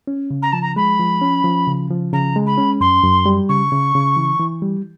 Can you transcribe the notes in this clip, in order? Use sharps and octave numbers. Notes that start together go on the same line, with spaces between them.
C#4
C#3
A#5
F3 A5
A#5
G#3 B5
F3
C#4
F3
C#3
F3
C#3 A#5
G#3
B5
C#4
F#2 C6
F#2
G3
C#3 C#6
C#3
C#3
E3
E3
G3